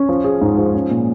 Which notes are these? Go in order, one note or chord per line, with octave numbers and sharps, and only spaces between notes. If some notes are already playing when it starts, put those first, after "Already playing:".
Already playing: C#4
F3
G#4
G#2
F3
C#4
A#2